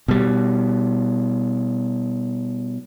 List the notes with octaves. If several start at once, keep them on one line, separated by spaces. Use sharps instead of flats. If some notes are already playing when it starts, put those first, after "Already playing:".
B2 G3